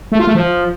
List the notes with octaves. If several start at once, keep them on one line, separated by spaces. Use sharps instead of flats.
A3
F4
A3
F3